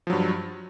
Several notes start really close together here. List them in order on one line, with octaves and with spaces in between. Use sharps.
F3 F#3 G2